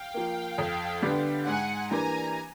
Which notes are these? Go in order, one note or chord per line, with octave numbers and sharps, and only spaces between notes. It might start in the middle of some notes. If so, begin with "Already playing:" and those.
Already playing: F5 G5
F3 A#3
F2
D3 G3 B3
G#2 F#5 G#5
E3 G3 A#3 D4 G#5 A#5